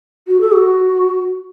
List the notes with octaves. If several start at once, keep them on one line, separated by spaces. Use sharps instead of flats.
F#4
A4
F#4